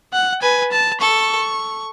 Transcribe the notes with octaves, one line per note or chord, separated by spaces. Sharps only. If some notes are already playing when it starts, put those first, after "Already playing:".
F#5
B4 G#5
A5
A4 C#6